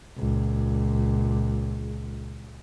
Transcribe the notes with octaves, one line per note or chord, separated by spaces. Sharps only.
C#2 A#2